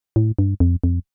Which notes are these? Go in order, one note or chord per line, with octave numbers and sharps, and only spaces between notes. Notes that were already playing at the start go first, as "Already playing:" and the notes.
A2
G2
F2
F2